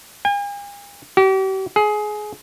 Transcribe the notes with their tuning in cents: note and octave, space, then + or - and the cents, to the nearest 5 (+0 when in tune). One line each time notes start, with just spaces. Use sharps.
G#5 -45
G4 -40
G#4 +20